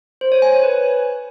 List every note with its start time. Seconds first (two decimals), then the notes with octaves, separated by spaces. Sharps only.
0.21 C5
0.32 C#5
0.42 G#5
0.53 C#5
0.63 B4